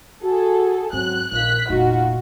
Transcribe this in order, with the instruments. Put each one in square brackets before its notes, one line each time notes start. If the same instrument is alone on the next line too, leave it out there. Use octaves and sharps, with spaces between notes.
[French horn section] F#4 [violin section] G#4 A4
[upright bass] G#2 [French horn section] F#3 C4 [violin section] F#6
[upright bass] A#1 [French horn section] D#3 F4 [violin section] F#6 B6
[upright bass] F1 A#2 [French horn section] D#4 [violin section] F4 F#4